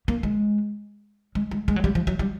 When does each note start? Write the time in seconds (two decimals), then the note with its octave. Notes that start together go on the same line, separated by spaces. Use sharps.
0.08 A#3
0.23 G#3
1.35 G#3
1.51 G#3
1.68 G#3
1.76 F#3
1.84 G3
1.95 F3
2.07 F#3
2.19 G3